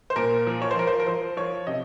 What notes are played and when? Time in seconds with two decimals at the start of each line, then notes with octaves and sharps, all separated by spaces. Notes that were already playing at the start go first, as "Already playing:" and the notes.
0.10 C5
0.16 A#2 A#4
0.47 F3
0.62 C#5
0.71 C5
0.76 F3 A#4
0.87 C5
1.00 A#4
1.06 F3 C5
1.37 F3 C#5
1.67 C3 D#5